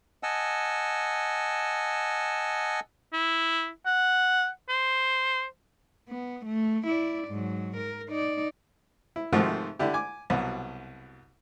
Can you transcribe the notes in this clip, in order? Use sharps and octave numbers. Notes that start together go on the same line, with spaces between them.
D#5 F#5 G#5 A5 E6
E4
F#5
C5
B3
A3
E4 D5
G#2 F#3
A#4
D#4 D5
E4
G#2 C3 D#3 F3 A3 F#4
D3 D4 E4 G4
G#5 D6
C2 B2 F#3